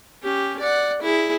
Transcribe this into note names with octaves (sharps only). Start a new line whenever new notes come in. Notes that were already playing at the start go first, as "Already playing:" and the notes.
C#4 G4
D5 F#5
E4 G#4